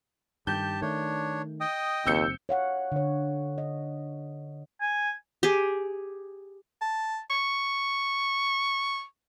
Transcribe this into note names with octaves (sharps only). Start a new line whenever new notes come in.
G2 D#3 G4 A5 G6
D#3 A3 D4 C#5
D#5 G5 D#6
F#1 D#2 C4 E6 G6 C#7
C#5 F5 F#5
D3 C#5
D#5
G#5
G4 G#4
A5
C#6